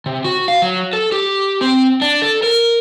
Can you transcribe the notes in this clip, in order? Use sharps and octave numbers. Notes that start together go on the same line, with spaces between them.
C3
F#4
F5
F#3
A4
G4
C4
D4
A4
A#4